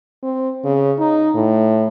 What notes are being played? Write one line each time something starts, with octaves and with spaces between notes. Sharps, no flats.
C4
C#3
D#4
A2